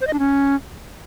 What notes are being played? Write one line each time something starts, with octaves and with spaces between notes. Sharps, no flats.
C5
D#5
D4
C#4